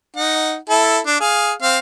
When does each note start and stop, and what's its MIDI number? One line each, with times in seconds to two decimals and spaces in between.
0.16 0.56 63
0.16 0.56 78
0.69 0.99 64
0.69 0.99 69
1.06 1.16 62
1.20 1.52 68
1.20 1.52 77
1.62 1.78 60
1.62 1.78 77